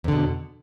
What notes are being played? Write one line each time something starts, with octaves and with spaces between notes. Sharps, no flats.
E2 B2 D3